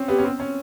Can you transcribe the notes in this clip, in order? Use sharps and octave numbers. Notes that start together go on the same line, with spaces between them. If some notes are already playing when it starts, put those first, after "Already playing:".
Already playing: C4 C#4
B3 G4
C#4
C4
C#4